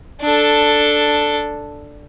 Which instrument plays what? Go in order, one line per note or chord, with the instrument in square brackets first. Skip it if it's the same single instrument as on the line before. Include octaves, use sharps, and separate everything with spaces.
[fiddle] D4 A4